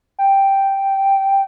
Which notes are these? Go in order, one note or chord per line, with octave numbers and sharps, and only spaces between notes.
G5